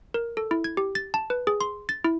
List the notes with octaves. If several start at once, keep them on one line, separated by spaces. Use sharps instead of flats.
A#4
A4
E4
G#6
G4
A6
A5
B4
G#4
C6
A6
E4